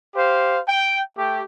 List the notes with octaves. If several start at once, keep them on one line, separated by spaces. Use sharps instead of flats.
G4 C5 F5
G5
A3 G4